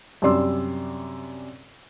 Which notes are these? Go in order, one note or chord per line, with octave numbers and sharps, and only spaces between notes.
F#2 C3 G3 D5 C6 E6